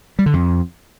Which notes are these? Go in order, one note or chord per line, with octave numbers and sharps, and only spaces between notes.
G3
D3
F2